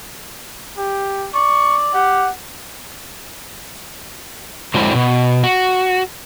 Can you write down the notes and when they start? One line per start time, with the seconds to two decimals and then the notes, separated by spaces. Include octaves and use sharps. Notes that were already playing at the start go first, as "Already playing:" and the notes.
0.78 G4
1.34 D5 C#6
1.94 G4 F#5
4.74 D3 F#3 G#3 C4 D4 E4
4.95 B2
5.43 F#4